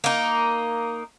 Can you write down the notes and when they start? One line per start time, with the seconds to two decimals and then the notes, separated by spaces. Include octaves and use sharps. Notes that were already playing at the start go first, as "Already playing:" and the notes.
0.04 A#3 D#4